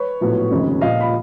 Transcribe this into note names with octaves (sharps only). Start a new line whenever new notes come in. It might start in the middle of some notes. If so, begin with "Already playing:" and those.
Already playing: B4 C#5
A#1 A2 F#3 B3
F1 D#2 C#3
A#1 A#2 F3 D#5 F5
B5